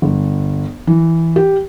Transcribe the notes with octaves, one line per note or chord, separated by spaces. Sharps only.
G1
E3
G4